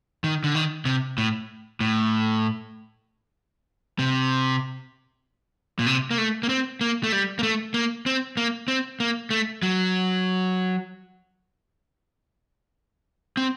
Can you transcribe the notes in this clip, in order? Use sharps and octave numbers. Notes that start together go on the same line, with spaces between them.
D#3
D3
D#3
C3
A2
A2
C3
A#2
C3
A#3
A3
A#3
C4
A#3
A3
G3
A#3
A3
A#3
C4
A#3
C4
A#3
A3
F#3
C4